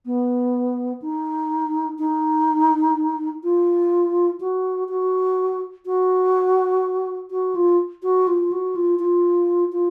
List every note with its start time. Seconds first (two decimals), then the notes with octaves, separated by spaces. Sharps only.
0.06 B3
1.02 D#4
1.99 D#4
3.43 F4
4.40 F#4
4.89 F#4
5.86 F#4
7.31 F#4
7.55 F4
8.03 F#4
8.27 F4
8.52 F#4
8.76 F4
8.99 F4
9.72 F4